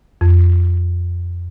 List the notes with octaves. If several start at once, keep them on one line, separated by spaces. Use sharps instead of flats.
F2